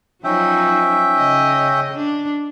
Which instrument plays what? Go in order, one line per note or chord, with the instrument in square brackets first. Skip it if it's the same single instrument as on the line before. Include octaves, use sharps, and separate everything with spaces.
[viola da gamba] F3 F#3 D#4 [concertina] C#4 E5 G5
[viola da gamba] C#3 D#5
D4